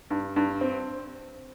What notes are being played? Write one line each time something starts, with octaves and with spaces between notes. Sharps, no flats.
G2
G2
C4